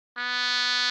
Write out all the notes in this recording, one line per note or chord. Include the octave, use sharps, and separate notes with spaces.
B3